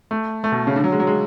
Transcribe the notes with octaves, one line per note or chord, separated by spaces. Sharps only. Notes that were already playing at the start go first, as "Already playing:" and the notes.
A3
A3
B2
C#3
D3
F#3
G#3
F#3
G#3